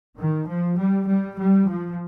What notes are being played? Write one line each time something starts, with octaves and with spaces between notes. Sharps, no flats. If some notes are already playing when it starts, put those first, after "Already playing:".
D#3
F3
G3
G3
G3
F3